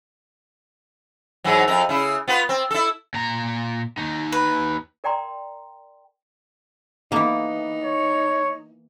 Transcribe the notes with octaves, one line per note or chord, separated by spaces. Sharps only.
G#2 E3 F#3
F2 A#4
C#3 E4
B3 F4 B4
C4
E4 A4
A#2 A#5
D#2 D#4
B4
A#4 D5 G5 A#5 C6
E3 A#3 B3 D#4
C#5